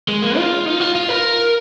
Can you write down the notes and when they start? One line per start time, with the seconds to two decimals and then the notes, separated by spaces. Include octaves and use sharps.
0.08 G#3
0.23 A#3
0.37 F4
0.66 D#4
0.80 F4
0.95 F4
1.09 A#4